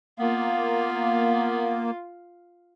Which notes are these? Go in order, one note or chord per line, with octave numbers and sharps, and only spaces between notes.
A#3 B3 F4